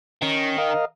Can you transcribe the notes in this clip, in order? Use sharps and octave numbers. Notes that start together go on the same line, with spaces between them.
D#3 C#4
A#4 D#5 F5